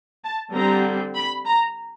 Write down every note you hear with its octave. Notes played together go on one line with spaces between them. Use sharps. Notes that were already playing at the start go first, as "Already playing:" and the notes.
A5
D3 G3 C4 A#5
B5
A#5